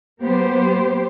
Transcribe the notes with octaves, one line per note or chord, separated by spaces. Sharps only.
F#3 A#3 B3 G4 C5